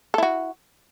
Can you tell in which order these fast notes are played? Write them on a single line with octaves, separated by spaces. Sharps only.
A4 E4 F#4